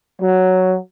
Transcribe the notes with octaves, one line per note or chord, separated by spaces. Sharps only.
F#3